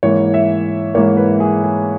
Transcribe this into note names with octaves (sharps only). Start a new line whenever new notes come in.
G#2 E3 A#3 C#5
E5
G#2 E3 A#3 C#5
B4
G#4
G#4